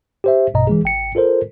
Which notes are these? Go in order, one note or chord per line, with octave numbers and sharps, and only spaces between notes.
G4 C5 E5
A#1 G2 B2 D#5 A#5
E3 G#3 G#4
A1 G5 C#7
F4 A4 A#4 C5